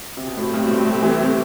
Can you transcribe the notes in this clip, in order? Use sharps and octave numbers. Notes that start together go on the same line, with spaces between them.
C3
B2
A2 A3 C4 G4
G2 B2
A2 C3
B2
A2 C3
C3 E3